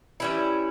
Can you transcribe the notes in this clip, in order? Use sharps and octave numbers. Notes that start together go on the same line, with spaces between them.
E3 G3 C#4 E4